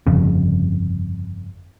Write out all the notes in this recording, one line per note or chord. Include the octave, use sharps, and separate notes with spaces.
G1 F2 C#3